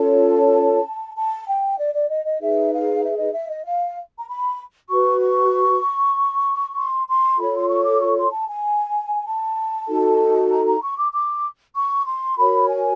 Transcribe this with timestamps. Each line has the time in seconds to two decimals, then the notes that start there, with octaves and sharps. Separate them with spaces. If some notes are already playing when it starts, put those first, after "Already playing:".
Already playing: C#4 F4 A4 C#5 A5
1.16 A5
1.47 G5
1.79 D5
1.94 D5
2.09 D#5
2.25 D#5
2.41 D#4 G#4 B4 E5
2.72 F5
3.03 E5
3.18 D#5
3.34 E5
3.49 D#5
3.65 F5
4.19 A#5
4.28 B5
4.89 F#4 B4 C#6
5.21 C#6
6.76 C6
7.08 C6
7.39 F4 A4 C#5 B5
7.55 C6
7.69 C#6
7.85 D6
8.01 C#6
8.16 C6
8.32 A5
8.47 G#5
9.26 A5
9.87 D#4 F#4 A4
10.50 A#5
10.65 A#5
10.81 C#6
10.97 D6
11.12 D6
11.74 C#6
12.05 C6
12.36 F#4 A#4 C#5 B5
12.68 G#5